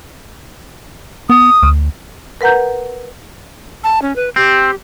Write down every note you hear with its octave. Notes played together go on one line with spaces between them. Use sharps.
B3 D#6
D2
A#4 B4 F#5 A#5 G6
A5
C#4
B4
C4 G4